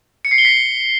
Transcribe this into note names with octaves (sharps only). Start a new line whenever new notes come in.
C#7
C7
G7
B6